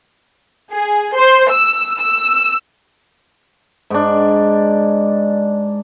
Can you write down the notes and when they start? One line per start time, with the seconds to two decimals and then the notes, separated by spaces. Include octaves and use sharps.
0.73 G#4
1.16 C5
1.51 E6
2.00 E6
3.90 G#2 D4